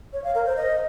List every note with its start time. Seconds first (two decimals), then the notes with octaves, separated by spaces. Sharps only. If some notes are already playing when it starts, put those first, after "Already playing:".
0.13 C#5
0.24 F5
0.35 A#4
0.46 C5
0.56 D#5